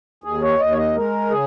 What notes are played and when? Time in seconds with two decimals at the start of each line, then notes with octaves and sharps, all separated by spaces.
0.24 D#2 G#4
0.42 C#5
0.59 D#2 D#5
0.71 C#5
0.77 D#5
0.95 G#3 A#4
1.30 C#3 G#4